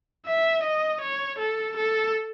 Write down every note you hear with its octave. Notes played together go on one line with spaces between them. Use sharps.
E5
D#5
C#5
A4
A4